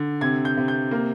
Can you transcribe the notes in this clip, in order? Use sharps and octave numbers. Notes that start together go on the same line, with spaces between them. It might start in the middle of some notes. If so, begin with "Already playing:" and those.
Already playing: D3
C3 G#6
G6
C3
G6
A#3